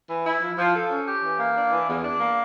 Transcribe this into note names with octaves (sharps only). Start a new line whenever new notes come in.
E3
E4
F3
F3
A4
C#4
G4
E3
A#3
D4
E3
E2
D4
A#3